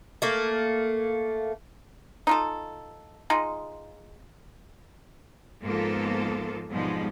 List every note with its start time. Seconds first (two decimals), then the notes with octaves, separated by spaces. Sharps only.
0.22 A3 A#3
2.27 D#4 F4 A4
3.30 G#3 D#4 F4
5.63 G#2 F3 A#3 B3 F4 A4
6.69 F2 G#2 B2 F3 G3 G#3